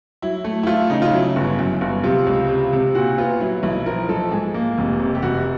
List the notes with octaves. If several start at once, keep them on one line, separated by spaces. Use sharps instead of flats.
F#3 E4
A3
E4
A3 F4
C#3 D#4
F4
F#3 E4
G1
F#2
G1
C3 F4
C#2
C3
C3
A#2 F#4
B3 F4
F#3 E4
B1 E4
F3 A#4
F3 A4
G#2 G#4
A#3
F1
C3
G4
F1 F#4